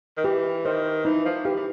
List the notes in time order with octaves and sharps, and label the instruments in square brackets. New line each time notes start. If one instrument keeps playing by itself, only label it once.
[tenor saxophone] D#3
[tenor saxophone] E3 [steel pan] G4
[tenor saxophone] D#3 [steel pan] C5
[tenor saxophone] E3 [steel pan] D#4
[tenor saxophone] F3
[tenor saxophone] E3 [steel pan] G4
[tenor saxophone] E3